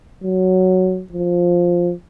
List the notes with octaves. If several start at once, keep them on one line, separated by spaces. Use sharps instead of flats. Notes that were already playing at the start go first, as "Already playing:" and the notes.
F#3
F3